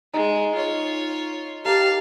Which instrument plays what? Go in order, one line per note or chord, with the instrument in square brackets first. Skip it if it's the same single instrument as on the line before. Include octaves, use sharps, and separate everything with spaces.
[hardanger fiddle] G#3 [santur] D#4
[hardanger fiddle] F4 C#5
[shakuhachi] G4 [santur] A#4 [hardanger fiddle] F5 A5